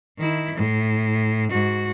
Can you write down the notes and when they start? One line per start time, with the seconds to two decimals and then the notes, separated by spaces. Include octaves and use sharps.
0.18 D#3 E4
0.55 A2
1.49 G#2 F#4